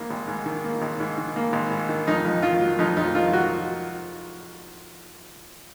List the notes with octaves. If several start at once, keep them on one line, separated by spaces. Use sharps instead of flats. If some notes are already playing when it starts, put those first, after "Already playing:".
Already playing: G#1 G#2 D#3 A#3
G#1
G#2
D#3
A#3
G#1
G#2
D#3
A#3
G#1
G#2
D#3
F2 D#4
F2
D#3 F4
F#3
F2 D#4
F2 D#4
D#3 F4
F#3 F#4